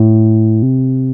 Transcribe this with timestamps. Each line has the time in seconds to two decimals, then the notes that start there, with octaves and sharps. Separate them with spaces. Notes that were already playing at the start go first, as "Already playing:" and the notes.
Already playing: A2
0.63 C3